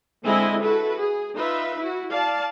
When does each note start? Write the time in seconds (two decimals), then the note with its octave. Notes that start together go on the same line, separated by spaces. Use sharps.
0.23 D3 G#3 C4 E4 D#5 G#5
0.61 E4 F#4 A4 B4
0.98 G#4
1.35 D#4 F4 B4 E5
1.79 E4 F#4
2.10 D5 F5 A5